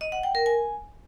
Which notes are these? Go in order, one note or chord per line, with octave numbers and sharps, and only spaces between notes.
D#5
F#5
G5
A#4
G#5